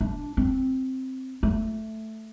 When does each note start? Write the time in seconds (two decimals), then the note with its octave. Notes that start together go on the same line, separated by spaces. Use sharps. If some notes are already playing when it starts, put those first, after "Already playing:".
0.01 D4
0.37 C4
1.43 A3